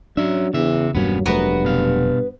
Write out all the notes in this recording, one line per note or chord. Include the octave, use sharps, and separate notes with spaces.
F#3 C#4 D4 E5
E2 C#3 E5
E1 G2 F#3 A#3 B3 C#4
F1 G2 F#3 A3 B3 F#4 A#4 B4
B2 F5